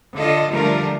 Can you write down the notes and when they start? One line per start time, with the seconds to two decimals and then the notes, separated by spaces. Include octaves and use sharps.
0.16 D3 F4 A4 D#5
0.52 D3 F3 G3 A3 F4 A#4